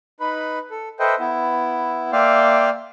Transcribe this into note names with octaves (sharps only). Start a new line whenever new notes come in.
D#4 B4 B5
A4
A4 B4 C5 D#5 E5 G5
B3 E4
A#3 D5 E5 F5 G5 C6